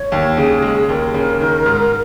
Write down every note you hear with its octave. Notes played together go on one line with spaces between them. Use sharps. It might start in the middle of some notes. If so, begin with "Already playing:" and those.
Already playing: C#5
D#2
C#3 G#4
G#3
D#2 A#4
C#3
D#3
G#2